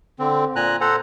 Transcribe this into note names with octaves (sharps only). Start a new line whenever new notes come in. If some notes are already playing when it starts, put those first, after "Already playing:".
D3 C4
A#2 G#5 A#5 F#6
A4 C5 F#5 A#5